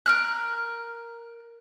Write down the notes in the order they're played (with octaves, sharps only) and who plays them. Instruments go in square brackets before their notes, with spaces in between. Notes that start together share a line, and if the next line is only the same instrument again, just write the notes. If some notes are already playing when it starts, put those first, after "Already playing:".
[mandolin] A#4 F6 F#6